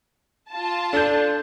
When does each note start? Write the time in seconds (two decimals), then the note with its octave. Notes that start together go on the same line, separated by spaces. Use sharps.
0.51 F4 A5
0.93 D4 A4 G6